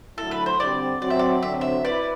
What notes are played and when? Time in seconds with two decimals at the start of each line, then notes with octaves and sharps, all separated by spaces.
0.18 D3 F#3 A3 E4 A4
0.31 B4
0.46 C5
0.60 D3 G3 C4 D5
1.01 F#3 C4 F#4 D5
1.10 E5
1.19 D5
1.43 D3 F#3 C4 E5
1.61 E5
1.84 E4 B4 D5